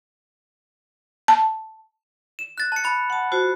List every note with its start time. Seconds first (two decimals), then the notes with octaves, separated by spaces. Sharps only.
1.28 A5
2.39 E7
2.58 F#6 A6
2.72 A5 C#7
2.84 B5 A6
3.10 F#5 A5
3.32 F4 F#4 C5